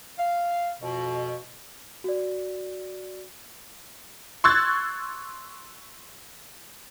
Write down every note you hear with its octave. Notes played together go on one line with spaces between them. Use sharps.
F5
F2 B2
F#4 D5
C6 C#6 E6 F#6 G#6 A6